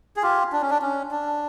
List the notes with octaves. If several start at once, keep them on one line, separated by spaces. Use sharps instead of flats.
G#4
F4 G4
D4
C#4
D4
C#4
D4